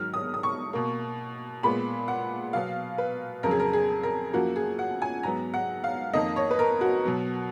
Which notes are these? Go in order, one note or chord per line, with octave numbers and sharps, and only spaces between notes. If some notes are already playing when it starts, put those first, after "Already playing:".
Already playing: G#2 D#3 F#3 F6
D#6
D#6
C#6
B2 A#3
A#2 G#3 B3 B5
F#5
B2 F#3 B3 F5
B4
F2 C#3 F#3 A#4
G#4
A#4
G#4
A#4
F#2 F3 A#3 F#4
G#4
F#5
G#5
G#2 F#3 B3 A#5
F#5
F5
F2 D#3 A#3 D#5
C#5
B4
A#4
F#4
B2 F#3 B3